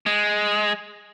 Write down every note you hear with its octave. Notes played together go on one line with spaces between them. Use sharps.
G#3